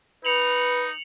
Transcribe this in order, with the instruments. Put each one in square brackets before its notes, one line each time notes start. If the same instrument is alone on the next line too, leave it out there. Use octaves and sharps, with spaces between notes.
[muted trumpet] D#4 [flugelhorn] B4 [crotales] C#7 F7 F#7